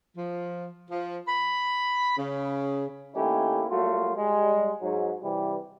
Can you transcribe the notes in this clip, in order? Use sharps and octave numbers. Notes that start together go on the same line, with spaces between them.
F3
F3
B5
C#3
D#3 A3 A#3 C#4 E4 G4
F#3 G3 A3 A#3 F4 F#4
G3 G#3
G#2 F#3
C3 E3 G3